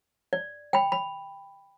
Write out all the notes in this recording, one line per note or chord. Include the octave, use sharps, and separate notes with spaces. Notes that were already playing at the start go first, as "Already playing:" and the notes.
D5
G5 B5
B5